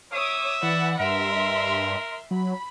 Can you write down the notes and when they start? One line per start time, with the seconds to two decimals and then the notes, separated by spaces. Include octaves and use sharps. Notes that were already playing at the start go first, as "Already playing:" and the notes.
0.13 C#5 E5 D6 D#6
0.63 E3 D5 F#5 B5
1.00 G2 A#4 E5 C6
2.31 F#3 B5